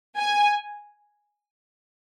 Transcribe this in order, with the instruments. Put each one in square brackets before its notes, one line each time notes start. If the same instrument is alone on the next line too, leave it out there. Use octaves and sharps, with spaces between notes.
[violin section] G#5